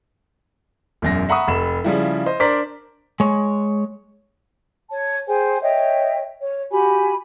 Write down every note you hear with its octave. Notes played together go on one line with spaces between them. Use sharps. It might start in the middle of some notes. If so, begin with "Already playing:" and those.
E1 F#2 A#6
E5 F#5 A#5 B5 C#6 D#6
F1 B5 E7
C#3 F3 G3 E4
C5 D#5
D4 A#4 C5 D5 B6
G#3 C#5
C#5 A5
G#4 C5 G5 G#5
C#5 D#5 E5 G5
C#5
F#4 G4 G#5 B5